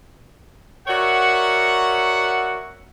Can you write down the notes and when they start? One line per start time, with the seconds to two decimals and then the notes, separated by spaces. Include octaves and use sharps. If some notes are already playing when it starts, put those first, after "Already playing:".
0.87 F#4 A#4 C#5 D5 E5 F#5